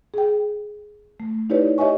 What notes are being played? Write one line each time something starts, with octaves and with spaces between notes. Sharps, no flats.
G#4 G5
A3
D#4 E4 G4 B4 C#5 D5
G4 C#5 D#5 E5 G#5 C#6